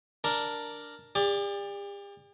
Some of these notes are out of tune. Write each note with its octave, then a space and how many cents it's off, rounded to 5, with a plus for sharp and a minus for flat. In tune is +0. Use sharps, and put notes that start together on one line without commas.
D4 +0 A#4 +0
G4 +45 D5 +0